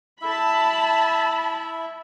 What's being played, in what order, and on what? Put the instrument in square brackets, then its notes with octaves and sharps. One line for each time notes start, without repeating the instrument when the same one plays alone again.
[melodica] E4 E5 [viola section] A5 B5